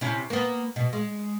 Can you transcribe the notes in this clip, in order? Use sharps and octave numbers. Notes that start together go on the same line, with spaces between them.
C3 C#4 E4
A#3 B3
B2
G#3